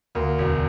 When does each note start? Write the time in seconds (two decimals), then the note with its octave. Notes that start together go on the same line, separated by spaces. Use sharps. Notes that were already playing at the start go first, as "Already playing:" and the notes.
0.15 D2 A#3
0.38 E1